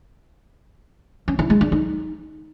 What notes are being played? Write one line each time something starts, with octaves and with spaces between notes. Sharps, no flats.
C#4
E4
G#3
D4
D#4